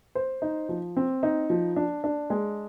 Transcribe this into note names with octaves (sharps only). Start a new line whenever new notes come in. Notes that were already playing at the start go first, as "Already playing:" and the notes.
C5
D#4
F3
C4
D#4
F3
D4
D4
G#3